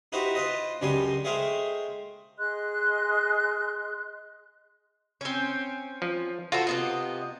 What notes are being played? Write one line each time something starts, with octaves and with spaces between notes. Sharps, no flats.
D#4 E4 F#4 G4 B4 C5
F4 B4 C5 D#5
C#2 F#2 G3 D4 G#5 C6
G#3 A3 G#4 C5 F5 G5
G#4 D#5 C6 F#6
C4 C#4
F3
F4 F#4 A4 C5
C3 B3 D#5